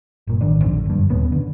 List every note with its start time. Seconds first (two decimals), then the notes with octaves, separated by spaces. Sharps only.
0.27 G1 A#2
0.41 A1 D#3 D4
0.61 A#1 F2 D3
0.86 F#1 G2
1.10 D#1 A#2 B3 C#4
1.32 D3